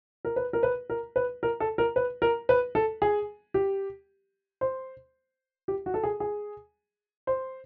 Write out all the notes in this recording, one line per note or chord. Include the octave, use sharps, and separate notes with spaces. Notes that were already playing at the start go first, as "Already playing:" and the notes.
A#4
B4
A#4
B4
A#4
B4
A#4
A4
A#4
B4
A#4
B4
A4
G#4
G4
C5
G4
F#4
A4
G#4
G#4
C5